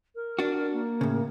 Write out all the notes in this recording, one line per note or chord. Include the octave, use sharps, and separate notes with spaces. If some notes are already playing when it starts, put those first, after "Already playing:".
A#4
D4 F#4
A#3
A2 C#3